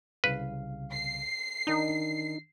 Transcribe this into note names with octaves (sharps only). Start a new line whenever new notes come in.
C2 C#3 B4 F5
C7
D#3 D4 D#4